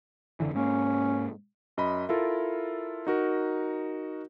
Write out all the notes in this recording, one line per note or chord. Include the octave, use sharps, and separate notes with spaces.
F1 D3 E3
G#2 A#3 C#4
F#2 D#5 B5
E4 F4 A4 A#4
D#4 F#4 A#4